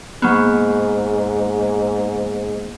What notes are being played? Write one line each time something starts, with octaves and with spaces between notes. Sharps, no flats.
G#2 F#3 A#3 B3